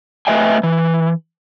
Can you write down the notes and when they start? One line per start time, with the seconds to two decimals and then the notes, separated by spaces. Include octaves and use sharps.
0.27 A3 B4 D#5 E5 G5 G#5
0.63 E3